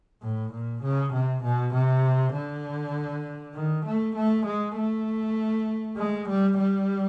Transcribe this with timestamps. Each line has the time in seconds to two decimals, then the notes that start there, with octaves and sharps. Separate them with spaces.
0.22 A2
0.52 A#2
0.82 C#3
1.13 C3
1.43 B2
1.74 C3
2.33 D3
3.55 D#3
3.86 A3
4.16 A3
4.46 G#3
4.77 A3
5.97 G#3
6.28 G3
6.59 G3